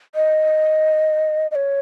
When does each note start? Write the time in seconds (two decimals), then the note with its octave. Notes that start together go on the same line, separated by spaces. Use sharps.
0.15 D#5
1.51 D#5
1.55 C#5